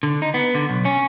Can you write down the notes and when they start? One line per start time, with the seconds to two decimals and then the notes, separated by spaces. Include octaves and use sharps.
0.03 D3
0.22 D#4
0.34 B3
0.55 D3
0.69 B1
0.85 C#4